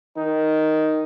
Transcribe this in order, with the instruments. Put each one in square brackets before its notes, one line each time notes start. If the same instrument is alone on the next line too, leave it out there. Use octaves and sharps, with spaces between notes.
[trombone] D#3 [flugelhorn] D#4